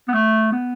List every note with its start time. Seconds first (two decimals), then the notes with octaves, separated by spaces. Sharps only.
0.09 B3
0.14 A3
0.52 B3